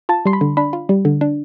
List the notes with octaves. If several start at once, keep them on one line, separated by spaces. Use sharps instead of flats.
F4 A5
G3 C6
B5
D3
D4 B5
F4
G3
D3
D4